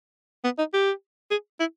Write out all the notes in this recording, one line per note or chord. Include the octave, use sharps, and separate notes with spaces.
B3
D#4
G4
G#4
E4